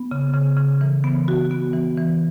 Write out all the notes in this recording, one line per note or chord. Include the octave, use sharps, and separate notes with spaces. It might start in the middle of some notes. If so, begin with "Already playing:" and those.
Already playing: B3
C#3
C#3
C#3
E3
B3
F#4
B3
E3
E3